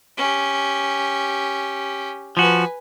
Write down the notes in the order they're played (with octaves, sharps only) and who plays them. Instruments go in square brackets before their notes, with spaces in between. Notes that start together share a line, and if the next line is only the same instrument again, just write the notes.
[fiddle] C#4 G4
[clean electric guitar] F3 F#4 [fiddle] B4 G#5